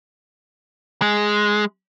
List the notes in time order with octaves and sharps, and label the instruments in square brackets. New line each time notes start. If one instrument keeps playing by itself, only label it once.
[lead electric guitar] G#3